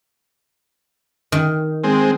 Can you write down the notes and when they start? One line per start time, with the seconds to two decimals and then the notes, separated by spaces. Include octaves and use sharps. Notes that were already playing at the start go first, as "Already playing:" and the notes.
1.32 D#3
1.84 G#3 C4